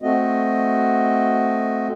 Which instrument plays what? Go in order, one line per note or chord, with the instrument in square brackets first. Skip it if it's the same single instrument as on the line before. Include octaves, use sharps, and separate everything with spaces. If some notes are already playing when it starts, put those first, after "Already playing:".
[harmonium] A3 C4 F#4 D#5